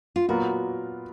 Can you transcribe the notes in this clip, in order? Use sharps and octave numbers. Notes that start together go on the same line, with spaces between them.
F4
A#2 F#3 B3 F4 F#4 A#4